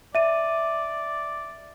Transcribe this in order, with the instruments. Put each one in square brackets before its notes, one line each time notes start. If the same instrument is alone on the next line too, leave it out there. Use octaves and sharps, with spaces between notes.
[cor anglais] D5 [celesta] E5 D#7